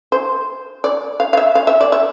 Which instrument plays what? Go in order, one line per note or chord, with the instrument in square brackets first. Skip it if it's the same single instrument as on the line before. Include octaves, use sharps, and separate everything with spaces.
[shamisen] C5
D5
F5
F5
E5
F5
E5
D5
E5